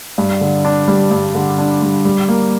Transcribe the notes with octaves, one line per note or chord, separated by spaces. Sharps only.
G2
D3
D4
G3
G2
D3
D4
G3
G3
A#3